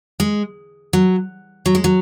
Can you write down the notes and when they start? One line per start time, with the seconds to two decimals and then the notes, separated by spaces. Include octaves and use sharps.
0.20 G#3
0.93 F#3
1.66 F#3
1.75 G#3
1.84 F#3